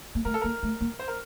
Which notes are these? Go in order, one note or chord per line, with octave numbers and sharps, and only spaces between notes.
A#3
A3 A#4
A4
A#3 A#4
A3
A#3
C5
A#4